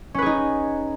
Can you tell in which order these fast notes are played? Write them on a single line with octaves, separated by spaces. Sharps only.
C#4 B4 G#4 D#4